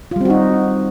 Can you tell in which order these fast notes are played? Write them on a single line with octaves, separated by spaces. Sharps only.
F4 G3 C4 F#4 D#4